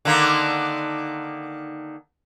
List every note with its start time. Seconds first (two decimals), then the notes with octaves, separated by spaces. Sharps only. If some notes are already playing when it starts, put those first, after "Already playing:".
0.05 D3 D#3 A#3